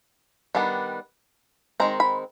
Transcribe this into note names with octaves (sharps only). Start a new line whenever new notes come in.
D#3 G3 B3 D4
D#3 G#3 C4 A#5
B5